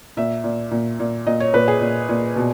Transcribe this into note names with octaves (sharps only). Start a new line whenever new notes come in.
A#2 E5
A#2
A#2
A#2
A#2 D#5
C#5
A#2 B4
G#4
A#2
A#2
B2